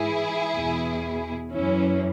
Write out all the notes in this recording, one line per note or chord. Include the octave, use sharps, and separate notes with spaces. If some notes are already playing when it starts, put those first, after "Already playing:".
Already playing: G#2 E3 E4 G#4
E2 B2
F#2 E3 C#4 E4